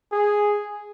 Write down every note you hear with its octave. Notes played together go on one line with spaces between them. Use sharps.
G#4